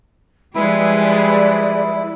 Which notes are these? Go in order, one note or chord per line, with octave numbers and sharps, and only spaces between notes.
F3 G3 G#3 E4 G#4 B4 D5